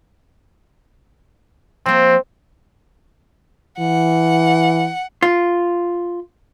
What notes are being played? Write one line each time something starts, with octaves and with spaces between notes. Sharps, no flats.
F3 A#3 C4
E3 F#5
F4